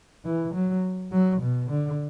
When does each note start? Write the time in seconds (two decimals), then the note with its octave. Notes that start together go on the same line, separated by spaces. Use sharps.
0.25 E3
0.54 F#3
1.12 F#3
1.41 B2
1.70 D3